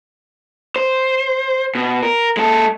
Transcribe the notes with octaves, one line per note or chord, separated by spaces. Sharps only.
C5
B2
A#4
G#3 A4